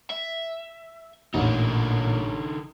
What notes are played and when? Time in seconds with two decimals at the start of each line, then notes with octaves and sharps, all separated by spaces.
0.10 E5
1.34 A1 A#2 D3 D#4